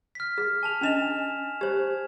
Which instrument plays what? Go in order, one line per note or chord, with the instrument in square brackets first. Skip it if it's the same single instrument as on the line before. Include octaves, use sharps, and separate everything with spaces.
[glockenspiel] F6 B6
[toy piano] G#4
[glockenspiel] G#5 A5 F7
[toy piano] C#4 D4 D#5 [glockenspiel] G#5 E7 F7
[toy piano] G4 C5 [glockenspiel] G#6